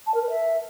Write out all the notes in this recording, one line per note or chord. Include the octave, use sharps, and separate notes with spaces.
A5
A#4
B4
E5